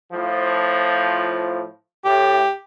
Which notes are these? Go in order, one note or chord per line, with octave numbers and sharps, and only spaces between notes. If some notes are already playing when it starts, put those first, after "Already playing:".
A2 F3
A2 G4